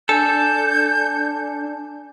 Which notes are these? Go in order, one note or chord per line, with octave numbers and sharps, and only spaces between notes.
D4 A4 G#5 G6